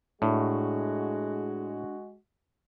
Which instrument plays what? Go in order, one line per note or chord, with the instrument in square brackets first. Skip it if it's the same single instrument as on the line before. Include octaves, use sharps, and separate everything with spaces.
[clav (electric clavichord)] A2 [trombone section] G#3 F#4 [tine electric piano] D4